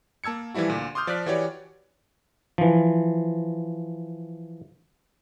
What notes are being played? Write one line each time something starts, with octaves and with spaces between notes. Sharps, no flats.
A#3 A5 E6 G#6 C#7
E3 F3 G3 E4 F#4
D2 A#2 D3
C6 D6 D#6 F6 G6
F3 D5 F6 F#6 B6
E3 F#4 G4 C#5 D5
E3 F3